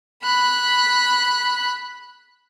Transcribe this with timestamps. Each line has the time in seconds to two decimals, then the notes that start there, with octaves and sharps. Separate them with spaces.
0.23 B5 F#6